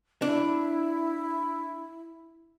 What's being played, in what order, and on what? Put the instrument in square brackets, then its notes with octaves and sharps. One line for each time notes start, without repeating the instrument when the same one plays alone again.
[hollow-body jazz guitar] D4 [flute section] E4